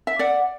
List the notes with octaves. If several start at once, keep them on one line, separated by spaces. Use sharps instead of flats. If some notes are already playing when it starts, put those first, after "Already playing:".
E5
D5 F#5